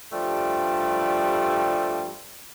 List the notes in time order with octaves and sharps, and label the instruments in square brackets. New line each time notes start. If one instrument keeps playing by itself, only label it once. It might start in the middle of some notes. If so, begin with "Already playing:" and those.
[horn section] G2 F3 G3 A3